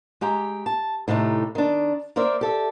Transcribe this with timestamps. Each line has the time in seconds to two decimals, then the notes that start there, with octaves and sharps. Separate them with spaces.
0.21 G#3 G4 G5 A#5
0.66 A5
1.08 A2 C3 A3 D#4 G4
1.55 D#3 D4
2.16 A#3 A#4 C5 D5 E5
2.41 G4 A4 E5